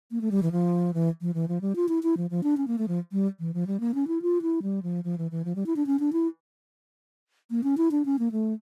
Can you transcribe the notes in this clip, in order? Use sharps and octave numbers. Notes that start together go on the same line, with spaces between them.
A#3
A3
G3
E3
F3
E3
F3
E3
F3
G3
F4
E4
E4
F3
F3
D4
C#4
A#3
A3
F3
G3
E3
F3
G3
A#3
C#4
E4
F4
E4
G3
F3
F3
E3
E3
F3
G3
E4
D4
C#4
D4
E4
A#3
C#4
E4
D4
C#4
A#3
A3